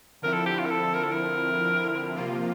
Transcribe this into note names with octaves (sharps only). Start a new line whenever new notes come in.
D3 F3 C4 E4 A#4
A4
G4
F4
A#4
A4
A#4
A4
A#4
C3 F3 A#3 F4